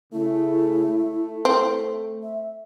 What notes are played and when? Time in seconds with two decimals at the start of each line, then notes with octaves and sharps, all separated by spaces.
0.13 C#3 A3 E4
0.86 A3
1.45 C4
2.23 E5